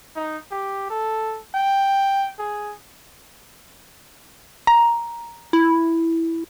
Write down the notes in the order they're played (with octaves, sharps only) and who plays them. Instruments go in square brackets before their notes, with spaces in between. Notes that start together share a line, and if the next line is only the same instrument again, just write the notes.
[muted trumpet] D#4
G4
A4
G5
G#4
[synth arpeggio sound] A#5
[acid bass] E4